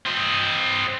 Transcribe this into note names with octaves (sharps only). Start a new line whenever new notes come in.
C4 D#5